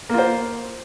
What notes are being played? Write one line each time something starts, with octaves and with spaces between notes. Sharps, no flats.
A#3 F4 C5